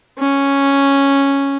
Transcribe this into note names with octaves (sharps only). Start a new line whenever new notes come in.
C#4